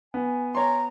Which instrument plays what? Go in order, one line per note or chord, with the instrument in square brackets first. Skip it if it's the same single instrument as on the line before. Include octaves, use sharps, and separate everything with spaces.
[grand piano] B3 [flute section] G#5
[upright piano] C#5 C6 [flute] A#5